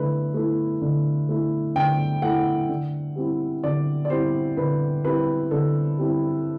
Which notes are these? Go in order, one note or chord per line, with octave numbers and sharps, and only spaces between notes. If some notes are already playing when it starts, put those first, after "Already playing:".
Already playing: D3 A3 E4 B4
A3 E4
D3
A3 E4
D3 G5
A3 E4 F#5
D3
G3 C4 E4
D3 D5
D5
G3 C4 E4 C5
D3 B4
G3 C4 E4 B4
D3 A4
G3 C4 E4